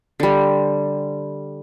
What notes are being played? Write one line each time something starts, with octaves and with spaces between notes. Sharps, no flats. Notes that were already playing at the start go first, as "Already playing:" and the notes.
D3 G3